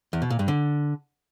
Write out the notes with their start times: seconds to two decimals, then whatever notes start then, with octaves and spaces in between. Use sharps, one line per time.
0.13 E2
0.22 B2
0.30 A#2
0.39 G2
0.48 D3